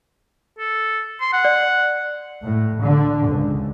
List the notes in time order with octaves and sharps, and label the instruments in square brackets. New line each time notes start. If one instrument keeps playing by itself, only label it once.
[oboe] A4
C6
F#5
[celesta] D5
[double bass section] A2
D3
C#2